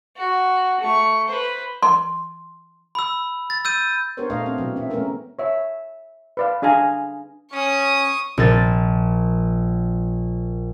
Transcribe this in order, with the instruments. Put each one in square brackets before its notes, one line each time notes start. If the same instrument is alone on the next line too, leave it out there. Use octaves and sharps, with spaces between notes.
[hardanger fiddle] F#4
A3 C#6
B4 C5
[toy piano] C6
[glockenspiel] B5 E6
A6
E6 G6 D#7
[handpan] B3 D4 G4 A#4 C5 C#5
A#2 A3 D4 D#5 F5
C4 G4
B2 E3 F#3
C#4 E5
G#3 A3 B3 C#4 A#4
[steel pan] C#5 E5
B4 D5 F5
D4 G#4 F5 G#5 A#5
[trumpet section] C#4 [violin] C#6 D#6
[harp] A#1 A#4 A6